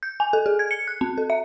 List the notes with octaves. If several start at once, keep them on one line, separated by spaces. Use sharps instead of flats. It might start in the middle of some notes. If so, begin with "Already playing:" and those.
G6
G#5
A4
G#4
G#6
C#7
F#6
C4
A4
E5